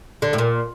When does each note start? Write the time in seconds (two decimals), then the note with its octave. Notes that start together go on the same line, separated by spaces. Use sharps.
0.22 D3
0.33 A2
0.38 A#2